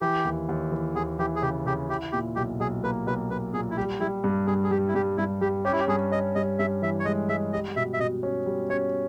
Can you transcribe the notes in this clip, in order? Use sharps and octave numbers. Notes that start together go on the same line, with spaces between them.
E3 G4
D#2
D#2
E3
D#2 G#4
E3 G4
G#4
C#3 G4
C#3 G4
E4 G4
A#2 G4
B1 G4
B1 G#4
A#3 B4
B1 B4
A#3 B4
A#2 G#4
E4
G3 G4
G3 E4
G2
G2 G#4
G#4
G3 G4
E4
G2 G4
G2 E4
G3 G4
C#4 G4
E4
G4
G2 G#4
C#4 D#5
G2 D#5
G2 E5
E3 E5
C#5
G#3 D#5
G#3 E5
G3 D#5
B2 E5
E5
B2 D#5
C#4
G3
C#4 C#5